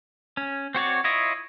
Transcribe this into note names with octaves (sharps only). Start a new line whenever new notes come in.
C#4
C4 F#4 C#5 D5
E4 F4 C#5 D#5